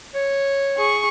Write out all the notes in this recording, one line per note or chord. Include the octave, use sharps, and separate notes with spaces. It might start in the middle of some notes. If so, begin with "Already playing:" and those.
C#5
G#4 C#6